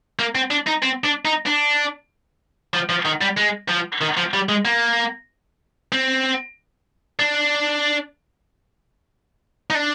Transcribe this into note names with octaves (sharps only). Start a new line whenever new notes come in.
A#3
C4
D4
D#4
C4
D4
D#4
D4
F3
F3
D#3
G3
G#3
F3
D#3
F3
G3
G#3
A#3
C4
D4
D#4
D4